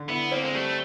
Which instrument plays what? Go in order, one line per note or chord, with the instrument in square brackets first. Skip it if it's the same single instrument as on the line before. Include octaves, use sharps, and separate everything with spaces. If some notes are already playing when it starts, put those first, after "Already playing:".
Already playing: [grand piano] D3
[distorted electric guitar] B3 [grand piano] E4
[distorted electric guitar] A#3 [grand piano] C4
[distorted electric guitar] G#3
[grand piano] G3 [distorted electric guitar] A3